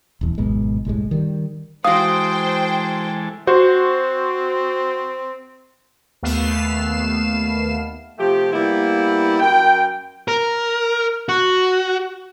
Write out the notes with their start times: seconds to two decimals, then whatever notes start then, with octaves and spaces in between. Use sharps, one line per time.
0.21 D#1 E2
0.38 G#1 F#2 B2 G#3
0.85 F#1 C2 A2 G#3
1.11 D#3 G3
1.85 E3 G#3 F#4 A4 C5 F5 G5 D#6
3.47 C4 F#4 C5
6.23 D#2 A3 B3 F5 C7 E7
8.18 C3 F3 A3 G4
8.52 G3 A#3 B3 E4
9.40 F#2 A#4 G5
10.28 A#4
11.29 F#4